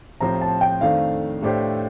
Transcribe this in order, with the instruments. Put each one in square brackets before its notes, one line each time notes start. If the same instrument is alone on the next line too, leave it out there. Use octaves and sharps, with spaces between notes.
[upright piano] A2 F3 C4 G4 C5 [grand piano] A#5
[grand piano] A5
G5
[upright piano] F2 D#3 A3 D4 [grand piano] F5
[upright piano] A2 A3 D4 G4 C5